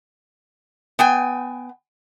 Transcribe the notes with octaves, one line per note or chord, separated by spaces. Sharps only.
B3 G5 G#5